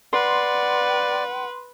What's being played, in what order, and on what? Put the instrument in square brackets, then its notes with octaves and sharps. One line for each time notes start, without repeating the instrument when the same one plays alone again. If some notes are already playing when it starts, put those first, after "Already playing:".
[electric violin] B4 [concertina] D5 [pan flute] F#5 [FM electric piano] C6